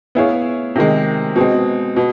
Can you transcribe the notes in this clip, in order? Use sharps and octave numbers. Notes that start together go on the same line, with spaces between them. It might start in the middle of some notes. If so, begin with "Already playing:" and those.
B3 E4 G#4 C#5 F5
C3 D#3 G#3
B2 G#3 C4
B2